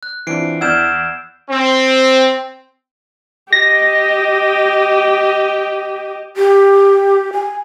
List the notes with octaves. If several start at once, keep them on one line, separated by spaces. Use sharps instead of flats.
F#6
E3 C4 D4 F4 C7 D7
E2 D5 F#5 E6 F6 G6 G#6 E7
C4
G4 D#5 A#6
G4
G#5